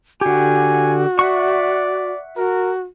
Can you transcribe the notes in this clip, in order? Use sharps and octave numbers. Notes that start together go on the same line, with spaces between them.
D3 F#4 G4 G#5
D5 E5 F#5 C#6
F#4 A#4